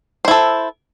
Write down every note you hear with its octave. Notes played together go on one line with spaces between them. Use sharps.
E4 A4 C5